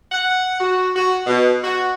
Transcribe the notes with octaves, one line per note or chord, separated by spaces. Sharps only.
F#5
F#4
F#4
B2
F#4